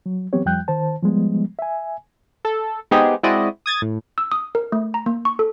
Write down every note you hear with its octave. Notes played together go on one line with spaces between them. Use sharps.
F#3
E3 F#3 B3 C4 G4 C#5
F2 F3 G3 G5 F#6 G6
D#3 C5 A5
F3 G3 G#3 B3
E5 G#5
A4
G#3 B3 C4 D#4 G4 G#4
G#3 C4 E4 F#4 D5 D#5
D#6 G#6 A6
A2
E6
D#6
A#4
A3
A#5
A#3
C#6
A4